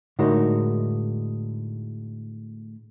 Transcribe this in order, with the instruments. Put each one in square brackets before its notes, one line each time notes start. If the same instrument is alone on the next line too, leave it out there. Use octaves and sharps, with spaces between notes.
[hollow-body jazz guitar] A2 D3 G#3 D#4 F#4 A#4